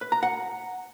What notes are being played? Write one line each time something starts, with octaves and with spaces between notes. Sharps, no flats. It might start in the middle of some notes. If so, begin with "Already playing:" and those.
B4
A#5
F#5